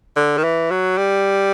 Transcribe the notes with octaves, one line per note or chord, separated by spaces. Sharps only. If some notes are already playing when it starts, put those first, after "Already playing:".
D3
D#3
E3
F#3
G3